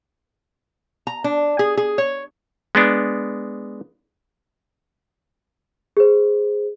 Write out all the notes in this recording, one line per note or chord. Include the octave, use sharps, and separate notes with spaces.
A#5
D4
G#4
G#4
C#5
G#3 B3 D4
G#4 C5